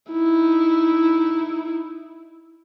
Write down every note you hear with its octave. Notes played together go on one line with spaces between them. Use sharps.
D#4 E4